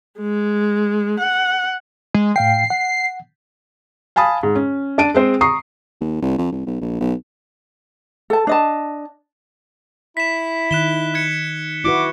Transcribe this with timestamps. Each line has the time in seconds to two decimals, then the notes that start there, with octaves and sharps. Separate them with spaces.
0.20 G#3
1.20 F#5
2.14 G#3
2.36 A2 F5 G5 C7
2.70 F#5
4.16 F5 G#5 A5 B5 D#6
4.43 G#2
4.56 C#4
4.98 D4 A5 D7 D#7
5.14 G#3 C4 C5
5.41 A#5 C#6 D#6 C7
6.01 D#2
6.22 C2
6.38 F2
6.52 C2
6.67 B1
6.81 A#1
7.00 B1
8.30 A4 A5
8.47 D4 D#5 A5
10.17 E4 B6 E7
10.71 D#3 F#6 E7 G7
11.14 F#6 G#6 C#7
11.84 E4 F#4 B4 D6